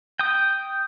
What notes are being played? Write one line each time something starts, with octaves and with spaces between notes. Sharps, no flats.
G5 D#6